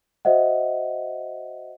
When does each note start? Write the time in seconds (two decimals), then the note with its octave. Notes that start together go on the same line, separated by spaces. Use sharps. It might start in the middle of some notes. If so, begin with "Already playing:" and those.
0.25 F#4 C5 D#5 E5 F#5